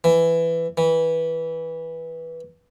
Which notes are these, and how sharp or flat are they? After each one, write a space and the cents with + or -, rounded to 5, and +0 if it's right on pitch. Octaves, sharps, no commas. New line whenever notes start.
E3 +10
E3 -15